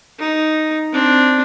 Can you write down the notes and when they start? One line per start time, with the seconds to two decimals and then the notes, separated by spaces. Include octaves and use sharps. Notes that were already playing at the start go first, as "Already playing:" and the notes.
0.19 D#4
0.92 C4 D4